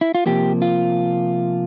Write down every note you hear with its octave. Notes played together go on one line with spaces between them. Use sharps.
E4
F4
C3 F3 A#3 G4
F4